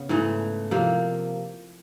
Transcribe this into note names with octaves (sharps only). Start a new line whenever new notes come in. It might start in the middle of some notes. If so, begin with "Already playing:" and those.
Already playing: C#3 B3
G#2 E3 A3
C3 F3 A#3